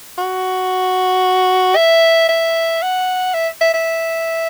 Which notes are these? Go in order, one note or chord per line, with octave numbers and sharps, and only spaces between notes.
F#4
E5
E5
F#5
E5
E5
E5